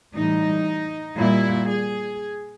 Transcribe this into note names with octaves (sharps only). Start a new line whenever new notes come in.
A2 E3 G3 D#4
A#2 G3 E4
G#4